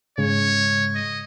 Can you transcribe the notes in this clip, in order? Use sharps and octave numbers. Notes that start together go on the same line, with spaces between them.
G#2 C#3 G#3 C#5
D#5